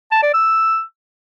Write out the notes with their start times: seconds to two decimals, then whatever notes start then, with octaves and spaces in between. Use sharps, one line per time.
0.12 A5
0.23 D5
0.34 E6